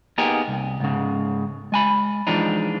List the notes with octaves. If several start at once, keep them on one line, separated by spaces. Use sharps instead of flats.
A#3 B3 D#4 G4 G#4
C2
C#2 G#2 C#3
G#3 G#5 B5
E3 F3 G#3 D4 D#4